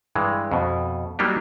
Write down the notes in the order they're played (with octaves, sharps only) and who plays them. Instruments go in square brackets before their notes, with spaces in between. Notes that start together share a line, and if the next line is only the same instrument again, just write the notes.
[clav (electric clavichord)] G2 E3 G#3
F2 B2
F#3 G3 A#3 D4 D#4 G4